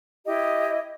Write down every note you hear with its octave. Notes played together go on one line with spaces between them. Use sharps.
E4 G4 D#5